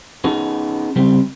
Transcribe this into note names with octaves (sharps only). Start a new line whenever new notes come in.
B3 C#4 D#4 G#4
C#3 G3 C4